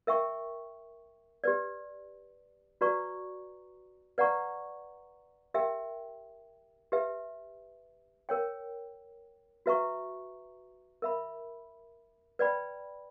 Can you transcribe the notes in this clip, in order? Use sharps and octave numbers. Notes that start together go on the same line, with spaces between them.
A#4 E5 G5 C#6
G4 B4 D5
F#4 B4 D5 A#5 C#6
B4 D5 F#5 A#5 C#6
G4 A#4 E5 G5
G4 B4 E5
A#4 C#5 G5
F#4 B4 E5 A#5 C#6
A#4 E5 B5
B4 D5 G5 B5